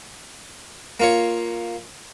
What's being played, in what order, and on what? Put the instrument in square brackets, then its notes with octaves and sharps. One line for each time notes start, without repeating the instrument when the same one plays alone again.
[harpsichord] A#3 F4 C#5